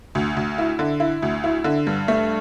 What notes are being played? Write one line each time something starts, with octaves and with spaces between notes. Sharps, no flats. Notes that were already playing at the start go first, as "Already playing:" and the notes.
D2
D2
E4
D3
E4
D2
E4
D3
G2
A3